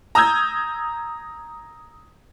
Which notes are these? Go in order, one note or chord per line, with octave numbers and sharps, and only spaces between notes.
A#5 D#6 E6 G6 G#6